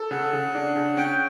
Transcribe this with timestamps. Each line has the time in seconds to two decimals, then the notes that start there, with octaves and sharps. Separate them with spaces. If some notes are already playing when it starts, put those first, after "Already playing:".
Already playing: A4
0.11 C#3 F#5
0.33 C#3
0.55 D4
0.76 C#3
0.97 C#4 G5